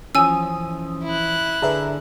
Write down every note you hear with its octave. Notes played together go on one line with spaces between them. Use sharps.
E3 F3 C#4 G#5 D#6 E6
E4 F#6
D3 D4 G#4 B4 E5 A#5